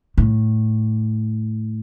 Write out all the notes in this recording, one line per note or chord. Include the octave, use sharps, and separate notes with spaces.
A2